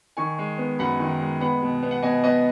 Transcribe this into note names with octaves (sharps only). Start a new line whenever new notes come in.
D#3 G#5 C#6
G#3
B3
F#2 F#5 B5
D#3
G#3
B3 F#5 B5
B2
B3
F#5
B2 D#5 G#5
B3 D#5